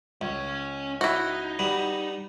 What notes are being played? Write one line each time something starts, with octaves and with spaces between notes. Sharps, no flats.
C#2 C#4 C#5
D#4 E4 F#4
G3 B3